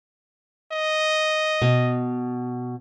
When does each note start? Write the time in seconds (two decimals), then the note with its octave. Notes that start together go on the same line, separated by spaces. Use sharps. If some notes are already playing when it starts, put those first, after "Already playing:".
0.72 D#5
1.62 B2